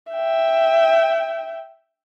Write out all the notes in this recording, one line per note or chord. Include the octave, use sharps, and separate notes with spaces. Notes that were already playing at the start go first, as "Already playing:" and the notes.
E5 G5